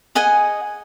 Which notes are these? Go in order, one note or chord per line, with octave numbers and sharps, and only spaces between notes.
G#4 D#5 F#5 G#5